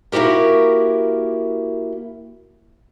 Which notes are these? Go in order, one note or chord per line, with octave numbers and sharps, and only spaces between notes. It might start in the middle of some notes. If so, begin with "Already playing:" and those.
A#3 E4 F#4 G4 A#4